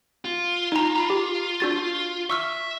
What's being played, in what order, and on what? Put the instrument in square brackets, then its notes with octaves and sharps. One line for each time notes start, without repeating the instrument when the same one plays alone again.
[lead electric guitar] F4
[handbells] D#4 A#5
A#5 B5
G4
D4 F#4 A6
[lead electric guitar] E5 [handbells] C#6 E6 F6